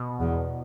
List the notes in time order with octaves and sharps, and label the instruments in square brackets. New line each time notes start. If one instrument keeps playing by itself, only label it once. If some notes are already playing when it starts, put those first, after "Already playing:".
Already playing: [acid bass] B2
[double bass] E2